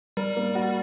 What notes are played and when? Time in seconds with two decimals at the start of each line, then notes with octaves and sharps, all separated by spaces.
0.17 G3 A#4
0.37 A#3
0.55 F#4